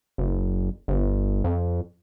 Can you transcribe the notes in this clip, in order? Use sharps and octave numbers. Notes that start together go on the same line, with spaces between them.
F#1
G1
F2